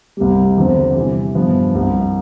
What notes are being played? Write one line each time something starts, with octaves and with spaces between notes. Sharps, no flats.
C2 C3 G3
E2 D3 F3 C4
C3 E3 G3
G2 F3 B3
C2 C3 G3